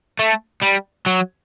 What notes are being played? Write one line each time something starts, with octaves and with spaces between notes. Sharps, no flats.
A3
G3
F#3